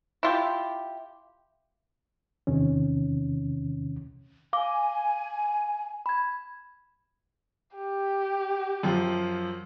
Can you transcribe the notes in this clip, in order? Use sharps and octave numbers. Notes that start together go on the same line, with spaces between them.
E4 F4 G4
E2 C3 D#3 C#4
F5 G#5 D6
B5 G#6
G4
F#2 F3